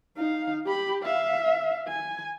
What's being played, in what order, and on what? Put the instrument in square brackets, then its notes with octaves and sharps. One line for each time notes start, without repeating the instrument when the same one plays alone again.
[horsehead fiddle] D#4 F5
G4 B5
E5 F5
G#5